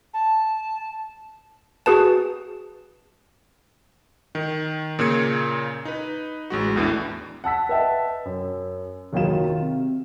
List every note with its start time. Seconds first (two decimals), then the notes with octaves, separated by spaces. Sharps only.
0.13 A5
1.86 F#4 G#4 B4 A5
4.35 D#3
4.99 A#2 C#3 A#3 G#6 C#7
5.85 D#4 B4
6.50 A1 G#3 F#4
6.76 E2 A2 E3 D4
7.44 F#5 A5 E6 B6
7.69 B4 D#5 E5 G5 A5
8.25 F#2
9.13 F#1 D#3 F#3 A#3 F4 E7
9.60 C3